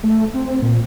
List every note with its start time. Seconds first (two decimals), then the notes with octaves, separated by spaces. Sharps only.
0.03 A3
0.34 C4
0.62 A#2